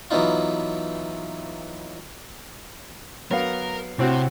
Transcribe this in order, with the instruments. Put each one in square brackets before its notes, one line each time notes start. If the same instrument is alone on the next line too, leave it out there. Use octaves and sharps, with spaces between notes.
[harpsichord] E3 F#3 B3 D#4 F4
[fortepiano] F#3 B3 F5 [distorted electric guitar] A#4
[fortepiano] A2 C4 F#4 [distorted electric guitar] C3